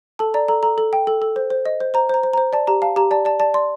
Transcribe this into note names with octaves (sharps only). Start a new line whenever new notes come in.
A4 A5
D5 A#5
A4 A#5
A4 A#5
A4
G5
A4
A4
C5
C5
D#5
C5
C5 A#5
C5 A#5
C5
C5 A#5
D5 A5
G4 A#5
F5 A5
G4 A#5
D5 A5
D5 A5
D5 A5
D5 C6